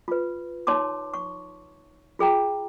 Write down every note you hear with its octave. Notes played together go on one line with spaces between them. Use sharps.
F4 B4
D#4 C#5 A5 C6 D6
C#6
F4 G#4 G5 A#5